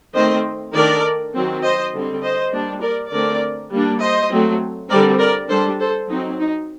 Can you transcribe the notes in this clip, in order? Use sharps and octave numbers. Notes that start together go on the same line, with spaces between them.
D#3 A3 C4 C5 D#5
D#3 A3 D4 A#4 D5
D#3 F#3 C4
C5 D#5
D3 G3 C4
C5 D#5
G3 A#3 D4
A#4 D5
D3 A3 C4 A#4 D5
G3 A#3 D4
C5 D#5
F#3 A3 C4
D3 G3 C4 A#4 D5
A#4 D5
G3 D4 A4 C5
A4 C5
F#3 C4 D#4
D#4